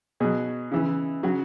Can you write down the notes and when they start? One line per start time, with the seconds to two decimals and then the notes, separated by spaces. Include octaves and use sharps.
0.20 B2 F#3 G#4
0.71 C#3 E3
1.23 C#3 F#3 F#4